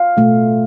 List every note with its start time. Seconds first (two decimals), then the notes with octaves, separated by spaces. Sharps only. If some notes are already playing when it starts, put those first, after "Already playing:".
Already playing: F5
0.17 B2 A3 F4